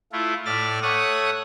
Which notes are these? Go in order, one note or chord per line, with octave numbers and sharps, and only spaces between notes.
A3 E4 F4
A2 D5 E5 F6 A6
A3 C#5 F#5 D#6 F#6